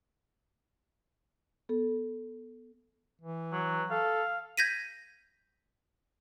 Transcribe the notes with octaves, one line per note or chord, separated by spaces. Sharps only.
B3 A4
E3
F#3
A4 F5
G6 G#6 A#6 B6 D#7